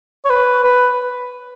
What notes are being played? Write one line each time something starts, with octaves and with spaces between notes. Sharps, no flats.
C#5
B4
B4